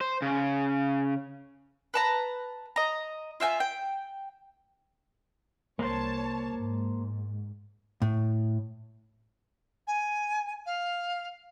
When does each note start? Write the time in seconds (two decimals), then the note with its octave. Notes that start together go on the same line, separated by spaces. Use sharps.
0.01 C5
0.22 C#3
1.94 B4 A5 A#5
2.76 D#5 A#5
3.40 F4 E5 G5 G#5
3.60 G5
5.79 C2 A#3 C5 C#5 A5
6.56 G#2
8.02 A2
9.87 G#5
10.66 F5